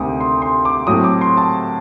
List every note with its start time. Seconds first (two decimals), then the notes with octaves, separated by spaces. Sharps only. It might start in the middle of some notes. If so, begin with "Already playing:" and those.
Already playing: D2 C3 D#3 A3 C4 D6 D#6
0.20 C6
0.42 C6
0.65 D6
0.87 A2 F#3 A3 C4 D#6
1.04 D6
1.21 C6
1.37 A5